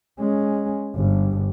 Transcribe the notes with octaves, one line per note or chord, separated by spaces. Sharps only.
G#3 C#4
G1 G2